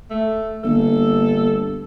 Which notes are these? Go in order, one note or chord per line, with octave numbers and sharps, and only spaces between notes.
A3
G1 A#3 A4